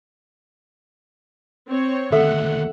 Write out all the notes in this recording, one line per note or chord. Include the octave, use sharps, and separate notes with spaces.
C4 C#5
D2 D#3 A4 E5 F#5